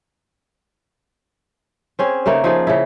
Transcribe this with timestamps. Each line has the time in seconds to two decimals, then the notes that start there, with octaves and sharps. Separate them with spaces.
1.99 C4 C#4 G#4
2.26 C#3 A3 A#3 D#4
2.44 F3 D#4 G#4
2.67 C#3 E4